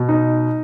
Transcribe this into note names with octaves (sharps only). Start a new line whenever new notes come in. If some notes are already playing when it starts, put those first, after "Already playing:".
Already playing: B2
D#4